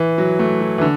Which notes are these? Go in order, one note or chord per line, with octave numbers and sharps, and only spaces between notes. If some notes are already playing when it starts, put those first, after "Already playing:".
Already playing: E3
F#3
A3
F#3
E3
D3